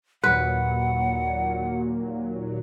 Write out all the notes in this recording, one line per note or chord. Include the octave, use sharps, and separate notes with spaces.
D#2 A#2 F#3 B4 F#5